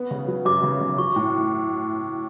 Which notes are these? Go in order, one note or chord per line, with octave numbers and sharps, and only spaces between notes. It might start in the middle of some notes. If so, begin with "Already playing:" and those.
Already playing: B3
C#3
F#3
F#2 D6
C#3
C#3
F#3 C#6
A2